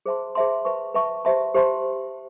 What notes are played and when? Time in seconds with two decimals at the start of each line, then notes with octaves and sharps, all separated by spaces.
0.06 G#4 C5 E5 A5 C6
0.35 G#4 C5 E5 A5 C6
0.65 B4 E5 A5 C#6
0.94 B4 E5 A5 C#6
1.25 G4 C5 E5 A5 C6
1.54 G4 C5 E5 A5 C6